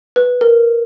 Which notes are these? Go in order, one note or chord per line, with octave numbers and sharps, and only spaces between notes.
B4
A#4